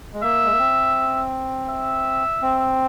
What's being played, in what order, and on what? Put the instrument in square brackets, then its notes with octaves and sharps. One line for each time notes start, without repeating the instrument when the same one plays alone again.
[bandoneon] G#3
[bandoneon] A#3 [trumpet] E5
[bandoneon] G#3
A#3
C4
[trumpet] E5
[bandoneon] C4